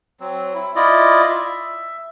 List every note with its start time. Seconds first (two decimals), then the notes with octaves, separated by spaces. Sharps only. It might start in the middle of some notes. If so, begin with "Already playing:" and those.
0.20 F#3 C4
0.54 E4
0.76 E4 F4 D5 D#5
1.29 E5